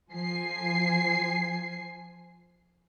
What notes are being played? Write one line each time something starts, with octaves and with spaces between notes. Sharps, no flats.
F3 G#5 C7